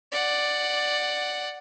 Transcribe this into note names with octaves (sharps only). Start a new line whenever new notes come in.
D5 F#5